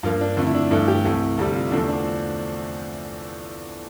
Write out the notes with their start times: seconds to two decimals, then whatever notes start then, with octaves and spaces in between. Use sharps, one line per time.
0.03 G2 F3 A#3 F4
0.21 D4
0.37 F2 D3 A3 F4
0.46 E4
0.55 D4
0.71 G2 E3 A3
0.88 G4
1.05 C2 C3 E3 A3
1.38 D2 C3 G3 A4
1.55 F4
1.71 E2 D3 F3 A3 D4
1.88 D4